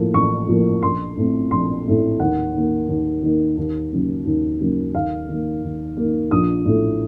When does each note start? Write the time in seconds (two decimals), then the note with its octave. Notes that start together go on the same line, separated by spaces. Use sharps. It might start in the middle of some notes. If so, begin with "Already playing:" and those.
Already playing: A2 F3 A#3
0.14 A1 C#6
0.48 A2 F3 A#3
0.83 A#1 C6
1.17 A2 A3 C4
1.51 A#1 C6
1.86 A2 A3 C4
2.20 D#2 F#5
2.54 D#3 A#3
2.89 D#2
3.23 D#3 A#3
3.57 D#2
3.92 C#3 F#3 A#3
4.26 D#2
4.61 C#3 F#3 A#3
4.94 D#2 F5
5.29 D#3 A#3
5.63 D#2
5.97 A#3
6.02 D#3
6.31 A#1 D#6
6.66 A2 A3